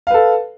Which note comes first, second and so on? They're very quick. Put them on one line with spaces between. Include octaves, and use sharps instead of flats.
F5 B4 A4